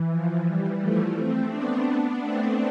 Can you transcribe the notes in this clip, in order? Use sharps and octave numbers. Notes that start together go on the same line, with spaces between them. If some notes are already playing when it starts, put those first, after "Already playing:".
Already playing: E3
F3
E3 G3
F3 A3
A3 C4
B3 D4
A3 C4